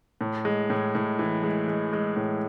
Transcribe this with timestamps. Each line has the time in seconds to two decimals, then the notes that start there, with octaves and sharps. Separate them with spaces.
0.21 A2
0.45 G#3
0.70 A2
0.95 A2
1.19 E3
1.43 G#3
1.68 G#3
1.93 G#3
2.16 A2